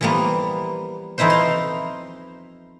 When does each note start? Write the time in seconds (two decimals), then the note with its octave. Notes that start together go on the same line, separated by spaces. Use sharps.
0.01 E3 F3 G3 A#3 B3
1.18 F2 E3 D#4 E4 B4 C5
1.30 F5 A#5 C6